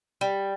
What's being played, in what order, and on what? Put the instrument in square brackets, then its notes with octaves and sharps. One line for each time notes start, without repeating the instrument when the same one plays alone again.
[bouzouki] G3